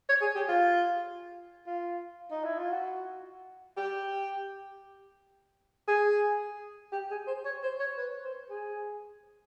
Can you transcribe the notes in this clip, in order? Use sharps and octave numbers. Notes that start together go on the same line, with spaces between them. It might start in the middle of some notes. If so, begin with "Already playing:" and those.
C#5
G#4
G4
F4
F4
D#4
E4
F4
F#4
G4
G#4
G4
G#4
C5
C#5
C5
C#5
B4
C5
G#4